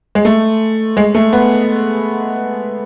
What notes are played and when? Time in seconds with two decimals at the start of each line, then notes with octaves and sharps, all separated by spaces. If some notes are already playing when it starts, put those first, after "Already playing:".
0.15 G#3
0.25 A3
0.97 G#3
1.15 A3
1.33 B3